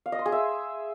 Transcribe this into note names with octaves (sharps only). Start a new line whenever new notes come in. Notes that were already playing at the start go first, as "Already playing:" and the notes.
F5
D#5
C6
G#4
E5